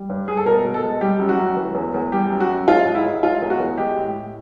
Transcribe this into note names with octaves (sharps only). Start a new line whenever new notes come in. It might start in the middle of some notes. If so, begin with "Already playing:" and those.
Already playing: G3
G2
G2 G#4
A4
B2 A#4
B2
A4
G#3
G3 G4
F#2
F#4
F#2
E3
E2
E2
G3 G4
F#2
F#4
F#2
G#3 F4
G#2
E4
G#2
G#3 F4
E2
F#4
E2
G#3 G4
A2
A2